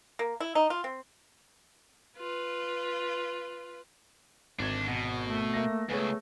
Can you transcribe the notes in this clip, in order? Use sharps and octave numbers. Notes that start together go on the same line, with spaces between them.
A#3
E4
D#4
F4
C4
F4 B4
G#1 D2 D4 G#6
B2
A3
A#3 E5 A#6
C#2 A3 B3 G#4 C#5